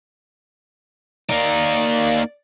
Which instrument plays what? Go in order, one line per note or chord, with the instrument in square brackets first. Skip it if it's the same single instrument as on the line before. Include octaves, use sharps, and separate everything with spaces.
[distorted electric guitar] A#3 D#4 [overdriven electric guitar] D5